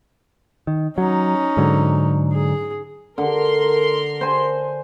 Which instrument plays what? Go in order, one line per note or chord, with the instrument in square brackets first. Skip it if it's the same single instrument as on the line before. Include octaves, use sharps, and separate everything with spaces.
[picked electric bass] D#3
[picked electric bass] F#3 [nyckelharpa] C#4 D#4
[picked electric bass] G#2 D3 F#3
[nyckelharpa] G#4
[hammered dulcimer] D3 [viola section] A#4 C6
[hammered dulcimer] C5 G#5